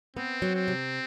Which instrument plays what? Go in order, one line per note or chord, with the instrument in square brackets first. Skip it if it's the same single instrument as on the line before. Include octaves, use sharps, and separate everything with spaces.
[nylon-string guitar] B3 [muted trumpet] C4
[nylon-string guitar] F#3
[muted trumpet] C4
[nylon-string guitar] C3